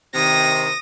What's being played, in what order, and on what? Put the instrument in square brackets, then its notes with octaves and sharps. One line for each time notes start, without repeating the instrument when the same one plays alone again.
[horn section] C3 D#3 [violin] D#6 A#6